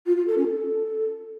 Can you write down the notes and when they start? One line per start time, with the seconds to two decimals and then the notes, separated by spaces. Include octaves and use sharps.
0.06 F4
0.17 F4
0.27 A4
0.38 C#4
0.48 A4